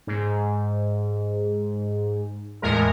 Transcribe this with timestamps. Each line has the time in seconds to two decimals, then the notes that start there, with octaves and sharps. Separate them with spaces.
0.07 G#2
2.62 E2 A2 G#3 A#4